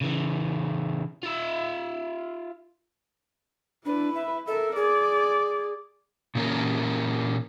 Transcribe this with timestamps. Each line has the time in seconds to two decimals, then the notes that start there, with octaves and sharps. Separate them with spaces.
0.01 C#3 E3
1.23 F4 E5
3.85 D4 E4 B4
4.15 E5
4.48 A4 A#4 E5
4.76 G#4 D5
6.35 A#2 E3 A#3 C#4 A#4